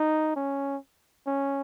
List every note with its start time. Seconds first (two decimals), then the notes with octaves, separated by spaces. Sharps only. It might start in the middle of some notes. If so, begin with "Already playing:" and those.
Already playing: D#4
0.36 C#4
1.27 C#4